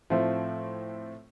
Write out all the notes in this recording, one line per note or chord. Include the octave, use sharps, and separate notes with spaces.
A2 F3 A3 C4